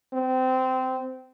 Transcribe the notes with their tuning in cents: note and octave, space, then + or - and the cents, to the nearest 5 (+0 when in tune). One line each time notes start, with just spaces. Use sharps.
C4 -20